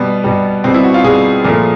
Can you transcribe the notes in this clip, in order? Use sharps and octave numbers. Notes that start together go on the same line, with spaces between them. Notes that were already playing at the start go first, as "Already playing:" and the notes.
Already playing: B2 G3 B3
B2 G3
B2 G3 C4
E4
F#4
F4
B2 G3 G#4
A#2 F3 A3